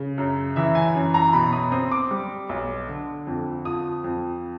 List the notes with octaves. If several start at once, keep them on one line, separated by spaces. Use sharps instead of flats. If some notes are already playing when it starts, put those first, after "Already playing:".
Already playing: C#3
F#2
E3 E5
G#5
F#2
A#5
B2 B5
D#6
C4 D#6
D6
G3
B1
D3
F2
F3 D#6
F2